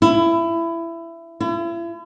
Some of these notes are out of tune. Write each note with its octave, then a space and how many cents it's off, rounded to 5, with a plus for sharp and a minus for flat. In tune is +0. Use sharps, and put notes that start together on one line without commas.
E4 +20
E4 +40